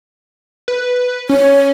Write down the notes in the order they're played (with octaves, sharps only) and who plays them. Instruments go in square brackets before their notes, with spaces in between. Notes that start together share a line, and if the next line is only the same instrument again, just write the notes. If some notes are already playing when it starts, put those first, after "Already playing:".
[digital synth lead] B4
[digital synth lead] C#4 [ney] C#5